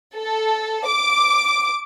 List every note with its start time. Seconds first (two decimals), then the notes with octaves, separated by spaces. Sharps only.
0.16 A4
0.87 D6